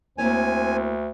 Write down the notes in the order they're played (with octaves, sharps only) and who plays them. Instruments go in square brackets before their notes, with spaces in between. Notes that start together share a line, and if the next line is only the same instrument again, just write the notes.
[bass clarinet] D2 [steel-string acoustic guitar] A#3 E4 C#5 [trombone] C4 [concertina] G#5